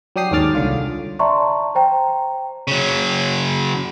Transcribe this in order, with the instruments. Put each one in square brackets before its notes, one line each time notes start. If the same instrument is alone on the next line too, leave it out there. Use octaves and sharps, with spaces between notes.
[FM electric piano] F#3 D4 G4 D#6 C7
D#2 G#2 C#4 D6 F6 A6
C2 D3 F4
[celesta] D5 E5 A5 A#5 C6 C#6
C5 G5 A#5
[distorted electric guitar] C#3 F#3